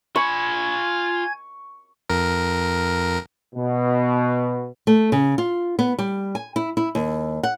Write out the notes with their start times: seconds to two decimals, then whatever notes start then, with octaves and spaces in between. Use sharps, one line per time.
0.16 F4 G#5 B5 C#6 G#6
2.10 F2 A#4
3.55 B2
4.87 A3
5.12 C#3
5.38 F4
5.79 B3
5.99 G3
6.35 G#5
6.56 E4
6.77 E4
6.95 D#2
7.43 F#5